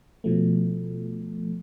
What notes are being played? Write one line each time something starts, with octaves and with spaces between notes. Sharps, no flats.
B2 F3 A3